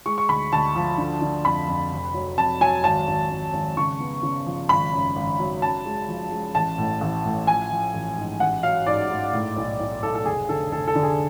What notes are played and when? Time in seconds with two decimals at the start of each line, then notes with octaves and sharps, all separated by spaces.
0.06 G#3 C#6
0.18 C#6
0.29 D2 B5
0.52 D2 A5
0.76 F3
0.98 D3
1.22 D3
1.45 F2 B5
1.68 F2
1.92 F1
2.14 F#3
2.38 F2 A5
2.61 F#3 G#5
2.84 G#1 A5
3.07 G#1
3.30 G#1
3.53 G#1
3.77 C#3 C#6
4.00 B3
4.23 C#3
4.46 F3
4.69 G#1 B5
4.93 F#2
5.16 G#1
5.39 F#3
5.62 F#2 A5
5.86 G#3
6.09 F3
6.32 G#3
6.55 A1 A5
6.78 A2
7.01 A1
7.24 A2
7.47 F3 G#5
7.71 F3
7.94 A1
8.17 G#2
8.40 A1 F#5
8.63 F#3 F5
8.86 G#2 D5
9.10 G#2
9.33 A2
9.56 B1
9.79 B1
10.03 B1 A4
10.15 A4
10.26 F1 G#4
10.49 D3 A4
10.72 F1 A4
10.87 A4
10.95 D3
11.03 G#4